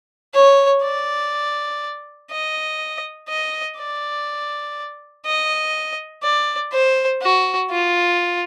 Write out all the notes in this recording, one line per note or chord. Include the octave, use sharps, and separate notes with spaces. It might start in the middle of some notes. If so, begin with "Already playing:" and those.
C#5
D5
D#5
D#5
D5
D#5
D5
C5
F#4
F4